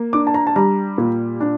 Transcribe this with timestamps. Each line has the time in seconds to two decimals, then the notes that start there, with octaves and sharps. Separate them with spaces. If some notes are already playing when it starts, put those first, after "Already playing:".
Already playing: A#3
0.13 D4 D6
0.27 A5
0.34 A#5
0.47 A5
0.56 G3 A#5
0.98 A#2
1.41 D4